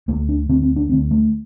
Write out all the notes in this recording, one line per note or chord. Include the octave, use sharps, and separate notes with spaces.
D2 D3 A#3
D4
D2 D3 C4
C4
D4
D2 D3 C4
A3